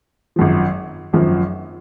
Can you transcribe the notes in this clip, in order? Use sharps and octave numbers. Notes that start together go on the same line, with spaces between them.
G#1 F#2 F3
G#1 F#2 F3